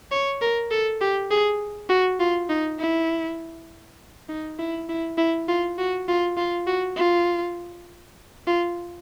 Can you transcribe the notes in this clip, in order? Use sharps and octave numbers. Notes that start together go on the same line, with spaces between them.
C#5
A#4
A4
G4
G#4
F#4
F4
D#4
E4
D#4
E4
E4
E4
F4
F#4
F4
F4
F#4
F4
F4